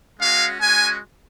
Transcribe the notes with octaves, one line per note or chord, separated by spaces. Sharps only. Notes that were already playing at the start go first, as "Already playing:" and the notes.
G#3 C#4 F#4 F5
G#3 C#4 F#4 G#5